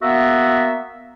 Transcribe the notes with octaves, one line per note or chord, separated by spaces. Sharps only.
A#3 B3 F#4 E5